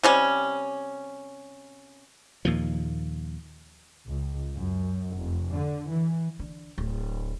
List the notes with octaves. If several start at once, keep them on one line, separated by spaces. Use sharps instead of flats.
C3 G3 C#4
D#2 A#2 F3
C#2
F#2
F1
D3
E3
D3
D1